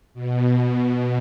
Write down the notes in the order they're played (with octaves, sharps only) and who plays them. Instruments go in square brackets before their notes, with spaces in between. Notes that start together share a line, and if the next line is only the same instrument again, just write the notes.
[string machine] B2